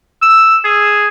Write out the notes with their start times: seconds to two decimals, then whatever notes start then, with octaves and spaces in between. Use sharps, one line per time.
0.22 E6
0.65 G#4